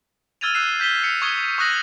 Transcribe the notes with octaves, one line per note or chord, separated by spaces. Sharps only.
E6 F6 G#6 A6 D#7 F7
E6 F#6 C7 E7
G6 B6 E7 G7
B6 C#7 F7
C#6 D#6 G#6 C#7 G7
C#6 D#6 F#6 A#6 F#7